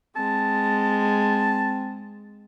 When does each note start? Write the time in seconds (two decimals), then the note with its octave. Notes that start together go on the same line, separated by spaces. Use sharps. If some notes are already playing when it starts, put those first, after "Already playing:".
0.16 G#3 C4 A5